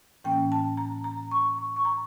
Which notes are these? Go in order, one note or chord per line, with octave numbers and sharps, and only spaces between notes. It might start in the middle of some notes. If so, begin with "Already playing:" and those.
A2 E3 A#3 C#4 G5
A5
A#5
A#5
C#6
C#6
C#6
A#5